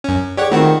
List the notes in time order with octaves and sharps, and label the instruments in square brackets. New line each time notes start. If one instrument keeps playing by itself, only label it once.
[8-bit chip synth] F#2 C#4
[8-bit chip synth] G4 C#5 F#5 [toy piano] G#4 D5
[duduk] D#3 [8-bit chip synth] A3 C4 F#4 [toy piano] F4 F#5 A#5